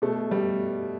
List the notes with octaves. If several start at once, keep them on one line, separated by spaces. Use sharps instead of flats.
B2 A3
G3